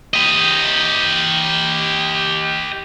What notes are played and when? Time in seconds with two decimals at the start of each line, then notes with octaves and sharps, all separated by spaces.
0.14 G4 D#5